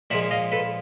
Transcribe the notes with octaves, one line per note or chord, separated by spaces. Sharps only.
A#2 F3 G#3 E5 F#5
D#5 F5
A4 B4